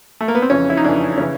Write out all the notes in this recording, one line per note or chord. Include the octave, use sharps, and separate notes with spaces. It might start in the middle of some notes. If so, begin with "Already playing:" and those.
A3
A#3
B3
C4
F2 C#3 E3 C#4
E4
D#4
F2 C#3 E3 D4
C#3 E3 C#4